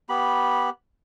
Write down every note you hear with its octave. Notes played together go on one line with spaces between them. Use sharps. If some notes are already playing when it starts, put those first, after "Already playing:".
B3 G4 B5